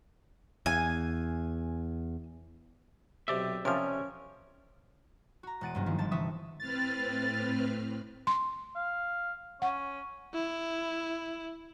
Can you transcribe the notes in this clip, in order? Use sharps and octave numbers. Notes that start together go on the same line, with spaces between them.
E2 G#5
B1 C3 G4 D5 E5
C3 F3 C#4 A#4
F#4 A#5
E1 G#3 F#5 A6 D7 D#7
F#1 G2 A#3
D#3 F3 B3 E4
G1 F3 A5 A6
C3 E3 E5 C#6 D#6
A2 C4 B4 F6 A6
C6
F5
C#4 F#5
E4